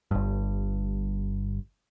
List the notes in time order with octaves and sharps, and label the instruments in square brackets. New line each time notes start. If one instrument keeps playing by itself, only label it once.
[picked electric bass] G1 G2